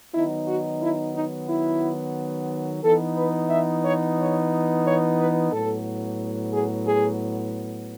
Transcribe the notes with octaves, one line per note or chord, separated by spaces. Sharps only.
D#3 F#3 B3 D#4 E4
F#4
E4
D#4
E4
E3 B3 D#4 A4
B4
E5
C#5
C#5
C#5
B4
A2 F#3 B3 A4
G#4
G#4